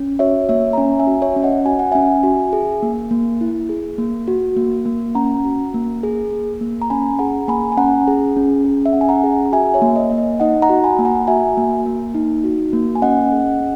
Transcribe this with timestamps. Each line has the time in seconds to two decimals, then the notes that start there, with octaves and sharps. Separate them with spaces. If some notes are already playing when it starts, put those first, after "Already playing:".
Already playing: C#4
0.19 F#4 C#5 E5
0.49 A#3 C#5 E5
0.73 A#5
0.77 C#4 E5 G#5
0.99 E5 G#5
1.07 F#4
1.22 C#5 E5
1.36 C#4
1.43 D#5 F#5
1.66 F#4 G#5
1.79 F#5
1.91 C#4 E5 G#5
2.23 F#4
2.53 G#4
2.83 A#3
3.11 A#3
3.41 E4
3.69 G#4
3.98 A#3
4.28 F#4
4.57 A#3
4.86 A#3
5.15 C#4 F#5 A#5
5.45 F#4
5.74 A#3
6.03 G#4
6.31 A#3
6.61 A#3
6.82 A#5
6.90 C#4 G#5 B5
7.19 G#4 F#5 A#5
7.48 A#3 G#5 B5
7.72 G#5
7.77 C#4 F#5 A#5
8.07 G#4
8.37 C#4
8.65 G#4
8.86 E5
8.93 C#4 F#5
9.01 G#5
9.09 F#5 A#5
9.24 G#4
9.46 A#5
9.52 F#4 E5 G#5
9.74 C#5 E5
9.82 A#3
9.96 D#5
10.11 A#3
10.18 D#5
10.40 D#4 D#5 F#5
10.62 F#5 A#5
10.69 F#4
10.84 G#5 B5
10.99 A#3 B5
11.05 F#5 A#5
11.27 F#4 E5 G#5
11.57 A#3
11.86 A#3
12.14 D#4
12.44 F#4
12.73 A#3
12.95 G#5
13.02 C#4 D#5 F#5
13.32 G#4
13.60 C#4